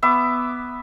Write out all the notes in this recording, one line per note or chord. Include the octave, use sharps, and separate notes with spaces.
B3 E5 D6